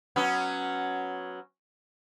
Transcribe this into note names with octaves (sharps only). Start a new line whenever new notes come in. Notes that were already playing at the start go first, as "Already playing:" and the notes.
F#3 B3 C#4